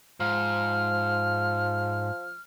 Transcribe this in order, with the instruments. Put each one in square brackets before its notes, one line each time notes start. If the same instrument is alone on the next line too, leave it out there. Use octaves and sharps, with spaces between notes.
[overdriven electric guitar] G#2 [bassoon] F3 [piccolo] F6